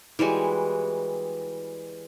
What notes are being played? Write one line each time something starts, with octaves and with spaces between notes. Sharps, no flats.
E3 G3 G#3 F#4